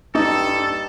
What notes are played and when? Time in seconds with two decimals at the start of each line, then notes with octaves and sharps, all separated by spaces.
0.15 G2 D#4 A4